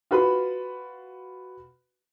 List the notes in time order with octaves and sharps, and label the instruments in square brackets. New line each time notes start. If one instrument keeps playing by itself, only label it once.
[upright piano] F4 F#4 B4 B5